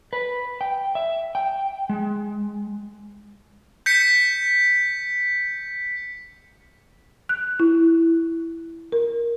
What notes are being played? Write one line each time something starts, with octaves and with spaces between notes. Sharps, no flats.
B4
G5
E5
G5
G#3
G6 B6 C#7
F#6
E4
A#4